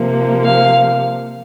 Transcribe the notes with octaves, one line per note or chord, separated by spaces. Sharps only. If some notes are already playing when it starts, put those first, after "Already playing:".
Already playing: C3 F3 A#3
F5